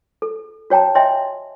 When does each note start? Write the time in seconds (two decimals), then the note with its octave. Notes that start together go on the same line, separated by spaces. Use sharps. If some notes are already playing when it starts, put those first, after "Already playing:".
0.22 A4
0.70 F#4 C#5 G5 A5 A#5
0.95 C#5 D#5 E5 G5 G#5 C6